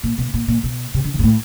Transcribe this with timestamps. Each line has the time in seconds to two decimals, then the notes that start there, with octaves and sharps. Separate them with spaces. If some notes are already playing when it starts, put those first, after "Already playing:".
0.03 A#2
0.18 B2
0.34 A#2
0.48 A#2
0.63 B2
0.94 C3
1.04 D3
1.14 D#3
1.19 A#2
1.23 A2